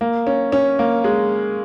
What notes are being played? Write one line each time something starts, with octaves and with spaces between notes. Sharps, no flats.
A#3
C#4
C#4
A#3
G#3